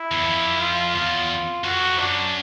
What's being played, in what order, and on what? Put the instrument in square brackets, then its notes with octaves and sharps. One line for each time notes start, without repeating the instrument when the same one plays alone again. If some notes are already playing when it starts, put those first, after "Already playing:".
Already playing: [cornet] E4
[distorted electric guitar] E2
F2
[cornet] F4
[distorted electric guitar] E2 [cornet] F4
[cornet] F4
[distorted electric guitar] F2 [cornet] F#4
[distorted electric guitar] F#2 [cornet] D4